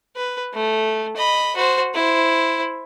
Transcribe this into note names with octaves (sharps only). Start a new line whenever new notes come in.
B4
A3
D#5 B5
F#4 C5
E4 C5